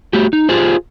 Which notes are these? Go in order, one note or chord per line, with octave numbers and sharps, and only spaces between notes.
A3 F#4 G4
D#4
F4 G4 G#4 C5